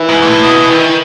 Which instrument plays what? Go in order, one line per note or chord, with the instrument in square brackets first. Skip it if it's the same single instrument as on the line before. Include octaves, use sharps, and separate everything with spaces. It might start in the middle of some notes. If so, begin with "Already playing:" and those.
Already playing: [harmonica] E3 E4
[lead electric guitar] G#2
G#2
A2
B2
D#3